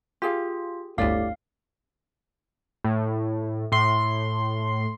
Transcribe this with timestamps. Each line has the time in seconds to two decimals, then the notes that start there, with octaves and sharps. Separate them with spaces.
0.22 F4 G4 G#4 F5
0.98 G1 D2 A2 G4 D5 F5
2.84 A2
3.72 A2 C6